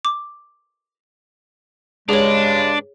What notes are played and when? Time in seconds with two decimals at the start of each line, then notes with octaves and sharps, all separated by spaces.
0.05 D6
2.09 G2 C#3 G#3 D4 G#4 C#5